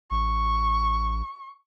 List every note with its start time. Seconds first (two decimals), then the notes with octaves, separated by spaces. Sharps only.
0.11 A1 C#6